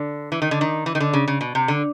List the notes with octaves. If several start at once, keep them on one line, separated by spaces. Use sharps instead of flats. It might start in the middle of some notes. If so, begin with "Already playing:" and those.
Already playing: D3
E3
D#3
D3
D#3
E3
D#3
D3
C#3
C#3
B2
C3
D3